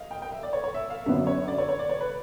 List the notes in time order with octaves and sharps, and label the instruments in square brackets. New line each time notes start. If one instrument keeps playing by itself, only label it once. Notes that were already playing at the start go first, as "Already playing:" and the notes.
Already playing: [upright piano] D#5 F5
G5
G5
E5
D5
C#5
C#5
E5
F5
[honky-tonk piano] F#2 D3 F#3 B3 [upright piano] E5
[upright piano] C#5
D5
C#5
C#5
D5
C#5
B4